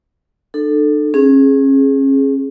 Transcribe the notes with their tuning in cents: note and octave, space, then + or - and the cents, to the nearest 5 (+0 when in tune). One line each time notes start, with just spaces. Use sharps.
D4 +45 A4 +0
C#4 -35 G#4 +5